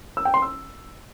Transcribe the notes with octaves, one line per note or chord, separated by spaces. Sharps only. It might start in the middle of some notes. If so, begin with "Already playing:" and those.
E6
G5
C6
E6